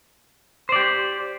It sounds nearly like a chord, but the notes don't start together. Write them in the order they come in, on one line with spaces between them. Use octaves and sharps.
C5 D5 G4